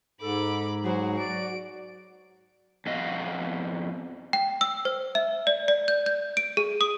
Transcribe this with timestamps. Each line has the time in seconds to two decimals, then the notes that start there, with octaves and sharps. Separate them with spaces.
0.21 G#2 A4 B5 D6
0.84 F#3 F#4 G#4 C5
1.18 D5 D7
2.86 F2 B3 D#5 F5
4.33 G5
4.61 E6
4.85 C5
5.15 E5
5.47 D5
5.68 D5
5.88 G6
6.06 G6
6.37 D7
6.57 G#4
6.81 D#6